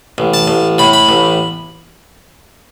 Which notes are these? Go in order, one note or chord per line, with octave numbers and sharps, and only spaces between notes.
A1
A5
A1
A2 B5
B5
A1